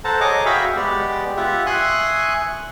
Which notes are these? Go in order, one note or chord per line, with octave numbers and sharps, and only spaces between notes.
A4 C5 F#5 A5 A#5
G#4 C#5 D#5 A#5 D6
F#4 E5 F5 G5 B5 C#6
G#3 B3 G4 D5
F4 G4 E5 F#5
E5 G#5 C6 C#6 D#6 F#6